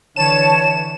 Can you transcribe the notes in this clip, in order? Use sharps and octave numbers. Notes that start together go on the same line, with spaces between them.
D3 E3 C#5 A5 E7